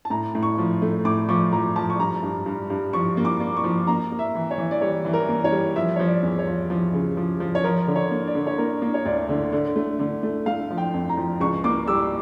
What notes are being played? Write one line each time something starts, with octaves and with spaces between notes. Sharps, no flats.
A5
A2 A#5
A2
C#6
F3
A3
A2 D6
F3 C#6
F3 A#5
F3 A5
C#6
G2 A#5
G2
G2
G2
F3 C#6
A#3
D6
A#3
C#6
F3
A#3 A#5
A#3
E5
E3
C#5
E3
D5
G3 C#5
E3
A#4
A#3
C#5
G3
F3 E5
F3 C#5
D5
E2
C#5
F3
F3
C#3
F3
F3
C#5
F3 A#4
D3
C#5
A#3
D5
D3
C#5
A#3 A#4
A#3
C#5
D2 D5
D3
D3
A3
D3
A3
A3 F5
F3
G5
F2
A#5
F3
C#2 C#6
A#3 D6
G3 E6